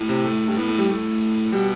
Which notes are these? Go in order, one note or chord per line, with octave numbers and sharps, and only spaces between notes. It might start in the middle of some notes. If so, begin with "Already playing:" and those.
Already playing: A2
C3
A3
G2
A2 B3
A3
G3
A2 A3
B2 G3